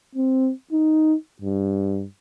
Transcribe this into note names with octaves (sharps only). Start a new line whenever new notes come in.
C4
D#4
G2